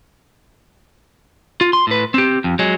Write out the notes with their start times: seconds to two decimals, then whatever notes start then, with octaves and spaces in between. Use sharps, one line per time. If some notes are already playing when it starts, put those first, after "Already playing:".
1.61 F4
1.73 C6
1.87 A2 B4
2.14 C4 G4
2.44 F2
2.59 F#3 G#3